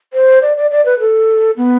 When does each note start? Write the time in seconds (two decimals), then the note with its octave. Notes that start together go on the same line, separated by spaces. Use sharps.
0.13 C5
0.42 D5
0.57 D5
0.71 D5
0.85 B4
1.00 A4
1.57 B3